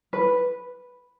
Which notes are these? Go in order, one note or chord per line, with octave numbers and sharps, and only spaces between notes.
B4